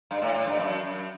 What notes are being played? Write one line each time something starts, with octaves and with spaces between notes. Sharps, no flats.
G2
A2
A2
G2
F#2
F#2